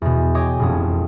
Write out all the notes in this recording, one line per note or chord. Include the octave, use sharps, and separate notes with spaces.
E2 B2
C#5 D#5 G5 G#5 D6 D#6
E1 A1 F2 B3 D#6